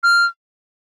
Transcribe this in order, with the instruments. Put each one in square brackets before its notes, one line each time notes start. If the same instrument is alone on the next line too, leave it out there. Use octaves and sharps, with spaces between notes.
[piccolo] F6